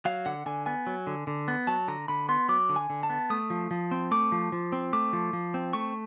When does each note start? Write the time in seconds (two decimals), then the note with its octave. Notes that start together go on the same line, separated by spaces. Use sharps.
0.05 F#3 F5
0.26 D3 F#5
0.46 D3 G#5
0.66 B3 G#5
0.87 F#3
1.07 D3
1.27 D3
1.48 B3
1.67 F#3 A5
1.88 D3 A#5
2.08 D3 B5
2.29 B3 C6
2.49 F#3 D6
2.69 D3
2.76 G#5
2.90 D3
3.03 A5
3.10 B3
3.30 A3 D#6
3.50 F3
3.71 F3
3.91 C4
4.11 A3 D6
4.32 F3
4.52 F3
4.72 C4
4.93 A3 D6
5.13 F3
5.33 F3
5.54 C4
5.73 A3 C#6